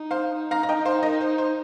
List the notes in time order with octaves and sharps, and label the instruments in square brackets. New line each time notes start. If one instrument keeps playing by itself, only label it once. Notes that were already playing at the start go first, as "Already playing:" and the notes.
Already playing: [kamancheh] D#4
[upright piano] C5 F5
[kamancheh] D#4
[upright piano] F5 A#5
A#5
D#5 G5
C5 F5
A#4 D#5
C5
C5